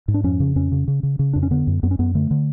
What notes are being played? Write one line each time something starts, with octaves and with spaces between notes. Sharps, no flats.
G#2
D4
F2 C#4
C#3
F2 C#4
C#3
C#3
C#3
C#3
F2 D4
C#4
D3 B3
F#2
F#2 B3
C#4
F#2 B3
D3 A3
D3